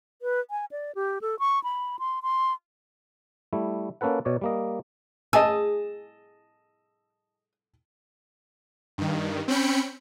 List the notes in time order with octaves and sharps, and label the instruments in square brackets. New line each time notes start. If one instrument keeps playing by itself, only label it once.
[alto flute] B4
G#5
D5
G4
A4
C#6
B5
C6
C6
[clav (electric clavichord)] G3 A3 E4
A#3 C#4 A4 B4 F#5
B2 C#5 D5
G3 A#3 D#5
[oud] G#4 [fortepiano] D#5 A5 E6
[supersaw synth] G2 D#3
C4 C#4 G5 B5 C#7